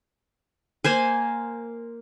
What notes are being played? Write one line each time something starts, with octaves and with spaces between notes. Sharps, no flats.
A#3 C5 G#5